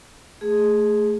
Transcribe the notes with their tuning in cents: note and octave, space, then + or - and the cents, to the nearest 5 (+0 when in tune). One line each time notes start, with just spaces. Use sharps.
A3 +0 G#4 +0